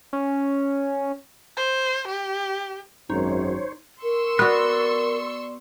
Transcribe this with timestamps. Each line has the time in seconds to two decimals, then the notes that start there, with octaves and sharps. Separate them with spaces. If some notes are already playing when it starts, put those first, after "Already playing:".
0.13 C#4
1.57 C5
2.08 G4
3.10 G#1 F#2 D#4 C5 C#5
4.03 A#4 C6 C#6 E6
4.39 B3 F#4 D5 F#6